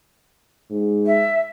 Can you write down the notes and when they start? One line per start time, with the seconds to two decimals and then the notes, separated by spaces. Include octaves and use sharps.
0.71 G#2
1.06 E5